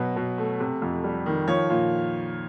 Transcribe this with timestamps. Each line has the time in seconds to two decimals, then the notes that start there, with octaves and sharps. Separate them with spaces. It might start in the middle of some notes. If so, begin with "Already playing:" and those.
Already playing: B2 F#3 B4
0.16 B2
0.38 A3
0.60 C3
0.82 F2
1.04 G3
1.26 D#3
1.47 F3 C#5
1.70 A#2